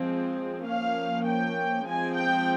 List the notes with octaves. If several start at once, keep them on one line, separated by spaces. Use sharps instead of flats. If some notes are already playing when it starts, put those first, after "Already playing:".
Already playing: F3 G#3 C4
F3 A#3 C#4 F5
G5
F3 G#3 C4 G#5
G5